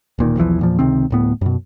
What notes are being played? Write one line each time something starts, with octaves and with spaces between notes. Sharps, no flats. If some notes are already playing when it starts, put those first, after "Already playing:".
D1 A#2 D#3
B1 E2 E3 F3
E2 A#2 F3
C#2 C3 D#3 C4
D1 A2 B3
F#2 B2